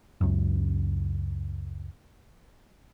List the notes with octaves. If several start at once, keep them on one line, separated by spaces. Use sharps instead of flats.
C#2 F#2